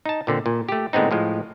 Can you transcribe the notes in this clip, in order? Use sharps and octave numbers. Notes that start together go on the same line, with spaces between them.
D#4 A5
A#2 D3 C4
A#2
A3 G4
A2 D3 G#3 B3 C4 D#4
A2 F3 G#3